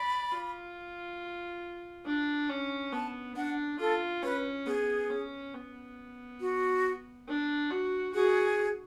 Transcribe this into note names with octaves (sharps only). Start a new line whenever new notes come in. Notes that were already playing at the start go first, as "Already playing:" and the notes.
Already playing: D5 B5
F4
D4
C#4
B3 A5
D4 F#5
F4 A4
C#4 B4
B3 G#4
C#4
B3
F#4
D4
F#4
F#4 G#4